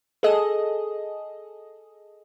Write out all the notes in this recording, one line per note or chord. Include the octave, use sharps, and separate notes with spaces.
G#4 A4 D#5